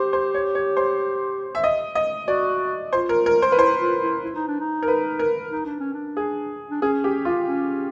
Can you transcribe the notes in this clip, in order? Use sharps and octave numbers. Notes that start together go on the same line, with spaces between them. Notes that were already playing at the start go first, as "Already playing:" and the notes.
Already playing: G4 C5
C5
C#5
C#5
C5
E5
D#5
D#5
F#4 D5
F4 C5
A#4
A#4
C5
B4
E4 C5
F4
E4
E4
D#4
D4
D#4
A#4
B4
A#4
D#4
D4
C#4
D4
G#4
D4
C#4 G#4
G4
F4
C#4